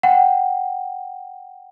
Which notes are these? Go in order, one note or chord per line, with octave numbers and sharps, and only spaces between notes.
F#5 G5